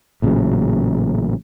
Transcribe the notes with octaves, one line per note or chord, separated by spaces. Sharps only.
A1 A#2 C#3 F#3